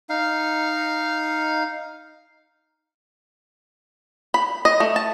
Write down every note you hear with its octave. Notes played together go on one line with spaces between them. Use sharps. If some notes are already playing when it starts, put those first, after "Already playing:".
D#4 F5
B5
D#5
A3
A5